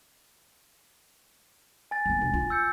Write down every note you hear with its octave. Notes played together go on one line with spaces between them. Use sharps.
G#5 A6
F#3 B3
E1
F4
E6 G6 C#7